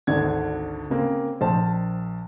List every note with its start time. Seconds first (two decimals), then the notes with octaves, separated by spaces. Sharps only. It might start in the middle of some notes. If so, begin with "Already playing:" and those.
0.07 G#1 D2 D3 G#6
0.90 C#3 A#3 C4
1.41 A#1 C5 A5